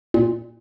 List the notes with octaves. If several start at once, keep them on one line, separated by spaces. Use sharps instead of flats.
A#2